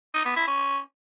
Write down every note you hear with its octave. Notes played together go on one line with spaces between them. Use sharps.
D#4
B3
E4
C#4